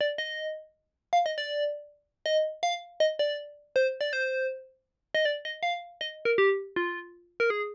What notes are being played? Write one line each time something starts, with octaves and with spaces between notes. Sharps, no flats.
D5
D#5
F5
D#5
D5
D#5
F5
D#5
D5
C5
D5
C5
D#5
D5
D#5
F5
D#5
A#4
G4
F4
A#4
G#4